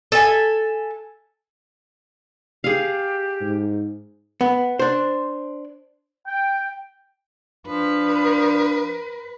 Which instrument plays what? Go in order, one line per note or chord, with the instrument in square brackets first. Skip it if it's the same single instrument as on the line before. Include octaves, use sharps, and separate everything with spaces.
[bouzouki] A4 E5 G#5
[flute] G4 [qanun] G#4 F5
[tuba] G#2
[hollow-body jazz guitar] B3
D4 C5
[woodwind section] G5
[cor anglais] F3 [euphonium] D4 [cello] B4